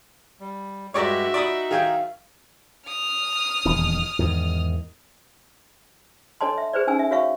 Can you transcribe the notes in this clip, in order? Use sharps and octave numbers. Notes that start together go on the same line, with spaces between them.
G3
G2 G#3 F#4 G4 C#5 D5 E5 A#5
D#4 D5 B5 D#6
D#3 G#4 F5 G5
D#6 F6
D#1 E2 D#3
E2 G#2 D#3
D4 A4 C#5 D#5 A5 C6
E5
G#4 B4 C5 D5
C#4 D#4 G#5 E6
E5
F#4 C#5 E5 F5 C#6